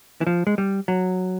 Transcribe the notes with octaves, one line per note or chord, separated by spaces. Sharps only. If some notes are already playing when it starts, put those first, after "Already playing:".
E3
F3
G#3
G3
F#3